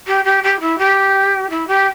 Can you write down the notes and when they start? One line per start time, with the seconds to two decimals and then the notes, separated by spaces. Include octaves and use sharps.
0.07 G4
0.25 G4
0.43 G4
0.60 E4
0.78 G4
1.50 E4
1.67 G4